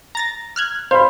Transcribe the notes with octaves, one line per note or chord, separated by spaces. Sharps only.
A#5 A6 A#6
F6 F#6 G#6
C5 F5 B5